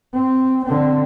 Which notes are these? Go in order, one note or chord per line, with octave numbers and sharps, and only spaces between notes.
C4
D3 C4